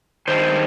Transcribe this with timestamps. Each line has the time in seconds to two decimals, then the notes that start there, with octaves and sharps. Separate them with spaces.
0.28 D#3 G3 D4 C5